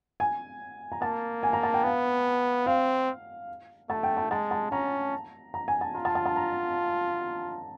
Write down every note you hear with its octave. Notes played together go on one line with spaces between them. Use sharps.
G#5
A#5
A#3 A5
G#5
A#5
A5
G5
B3 F5
C4 F5
A3 A5
G5
A5
G#3 A5
A5
C#4 A#5
A#5
G#5
A5
F4 A#5
A5
A5
A5
A#5